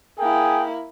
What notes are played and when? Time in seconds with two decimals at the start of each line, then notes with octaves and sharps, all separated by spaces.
0.19 A#3 E4 G#4 G5